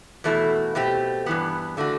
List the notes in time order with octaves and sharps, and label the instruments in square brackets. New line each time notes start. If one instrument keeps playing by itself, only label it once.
[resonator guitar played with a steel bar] E2 B2 A3 E4
B2 A3 C4 G4
G2 E3 B3
D3 A3 D4 F#4